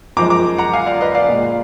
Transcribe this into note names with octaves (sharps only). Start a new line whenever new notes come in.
F#2 F3 G#3 A#5 D6
A#5 D6
F#5 A#5
F5 G#5
D5 F5
B4 D#5
D5 F5
A#2 G#3